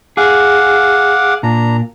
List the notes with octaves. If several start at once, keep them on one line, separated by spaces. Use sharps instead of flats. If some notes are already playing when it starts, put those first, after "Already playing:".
G#4 F5 F#5 D6
A#2 D4 A#5